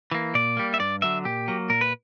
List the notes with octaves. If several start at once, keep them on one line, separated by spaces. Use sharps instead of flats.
E3 A#3
A#2 D5
G3 A#3
E5
G2 D5
D3 F#3 A#3 E5
A#2 G4
F#3 A#3
A#2 A#4
B4